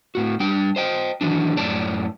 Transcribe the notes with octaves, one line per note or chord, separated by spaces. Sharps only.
A2 F#4
G3 D4 G5
C5 D#5 G5
D#3 E3 F#3 D4
F#2 A2 C#5 D5 A5